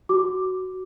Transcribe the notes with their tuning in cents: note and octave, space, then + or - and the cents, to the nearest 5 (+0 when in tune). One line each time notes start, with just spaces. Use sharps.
F#4 +10 D6 +0